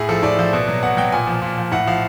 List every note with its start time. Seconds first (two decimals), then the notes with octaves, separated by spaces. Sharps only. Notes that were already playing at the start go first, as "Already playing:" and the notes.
Already playing: A2 G#4
0.09 F3 A4
0.23 A2 D5
0.39 F3
0.53 B2
0.68 F#3
0.83 B2 F#5
0.97 F#3 G5
1.12 A#2 G#5
1.27 F3
1.42 A#2
1.58 F3
1.72 A2 F#5
1.87 F3 F5